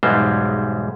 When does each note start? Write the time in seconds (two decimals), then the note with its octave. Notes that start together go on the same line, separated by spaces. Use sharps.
0.03 B1 E2 G#2 G3 G#3 C5